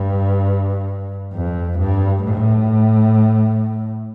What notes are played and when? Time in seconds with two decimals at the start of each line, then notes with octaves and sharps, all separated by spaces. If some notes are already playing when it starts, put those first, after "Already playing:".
Already playing: G2
1.33 F2
1.79 G2
2.24 A2